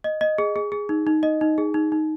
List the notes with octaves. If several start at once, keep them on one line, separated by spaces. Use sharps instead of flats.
D#5
D#5
G#4
G#4
G#4
D#4
D#4
D#5
D#4
G#4
D#4
D#4